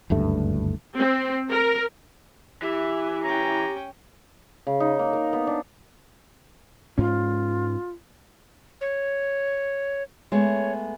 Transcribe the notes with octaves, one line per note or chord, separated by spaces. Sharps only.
F#1 D2 G2 A3
C4
A#4
E3 G4 E5
C#4 G5 A#5
C#3
D#4
A#3
A#4
B3
D4
G#2 C#4 F4
C#5
G#3 A3 B3 C#5